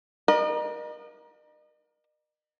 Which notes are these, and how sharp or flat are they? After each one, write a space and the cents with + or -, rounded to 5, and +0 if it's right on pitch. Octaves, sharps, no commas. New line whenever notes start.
A#4 +30 D#5 -40